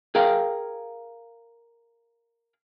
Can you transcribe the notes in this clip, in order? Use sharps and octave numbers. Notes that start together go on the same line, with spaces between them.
G#4 A#4 F5 G5